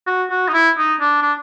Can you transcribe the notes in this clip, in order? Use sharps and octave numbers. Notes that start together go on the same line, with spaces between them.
F#4
F#4
D#4
E4
D#4
D4
D4